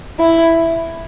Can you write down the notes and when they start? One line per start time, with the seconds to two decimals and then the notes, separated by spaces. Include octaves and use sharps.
0.20 E4